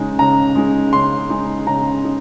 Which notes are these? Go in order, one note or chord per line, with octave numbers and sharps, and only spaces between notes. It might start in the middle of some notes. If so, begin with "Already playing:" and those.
Already playing: C#3 G#3 D#4
C#3 A#5
G#3 D#4
C#3 C6
G#3 D#4
C#3 A#5
D#4